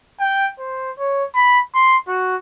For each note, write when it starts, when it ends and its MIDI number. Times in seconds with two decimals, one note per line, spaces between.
0.20 0.49 79
0.59 0.91 72
0.99 1.24 73
1.35 1.60 83
1.74 1.97 84
2.08 2.36 66